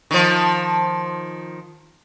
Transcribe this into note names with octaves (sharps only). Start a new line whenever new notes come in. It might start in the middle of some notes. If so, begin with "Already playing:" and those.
D#3 F3